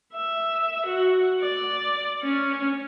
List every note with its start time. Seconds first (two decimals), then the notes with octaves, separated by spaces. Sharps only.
0.13 E5
0.87 F#4
1.41 D5
2.23 C#4